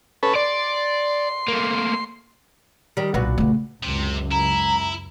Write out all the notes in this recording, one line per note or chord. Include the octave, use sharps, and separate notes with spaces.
C#4 A4 B4
D5 C6
A3 A#3
D#3 G3
B1 A#2 F#4 B4
C#3 A3
C#2 F#2 C3
E4 A#5